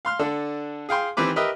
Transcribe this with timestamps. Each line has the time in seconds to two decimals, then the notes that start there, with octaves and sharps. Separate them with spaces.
0.05 F5 C6 F6
0.19 D3 D4 A4
0.89 G#4 F5 G5 C6
1.17 D#3 E3 C4 G4 B4 D6
1.36 G4 A#4 B4 D#5 E5